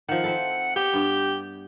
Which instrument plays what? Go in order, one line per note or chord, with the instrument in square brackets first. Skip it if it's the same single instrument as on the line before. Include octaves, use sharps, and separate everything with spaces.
[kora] D#3 F3 [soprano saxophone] F#5
[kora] C4 E4 A4
[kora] B3 [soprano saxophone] G4
[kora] G2 B3